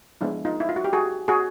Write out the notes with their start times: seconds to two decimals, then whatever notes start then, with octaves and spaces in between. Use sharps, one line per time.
0.21 F3 G#3 B3 D4 E4
0.45 D#4 F4
0.60 E4
0.69 F4
0.76 F#4
0.84 G4
0.93 F#4 G#4
1.28 F#4 G#4